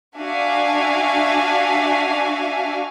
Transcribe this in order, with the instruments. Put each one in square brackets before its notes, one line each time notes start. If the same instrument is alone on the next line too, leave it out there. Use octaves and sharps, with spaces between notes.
[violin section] D4 F#4 E5 F5 G#5